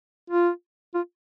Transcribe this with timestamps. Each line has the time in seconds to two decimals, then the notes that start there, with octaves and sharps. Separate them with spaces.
0.30 F4
0.94 F4